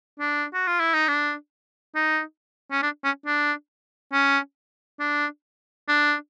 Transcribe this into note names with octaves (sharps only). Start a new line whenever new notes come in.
D4
F#4
F4
E4
D#4
D4
D#4
C#4
D4
C#4
D4
C#4
D4
D4